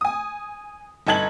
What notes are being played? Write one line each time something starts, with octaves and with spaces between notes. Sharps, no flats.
G#5 D#6
G1 D#4 A5 G#6 F#7